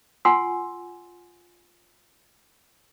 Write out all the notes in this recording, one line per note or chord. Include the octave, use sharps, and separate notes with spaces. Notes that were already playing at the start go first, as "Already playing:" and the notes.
F4 F#5 G#5 C6 E6